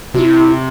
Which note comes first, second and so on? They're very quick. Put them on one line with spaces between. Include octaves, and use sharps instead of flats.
C3 F#4 E4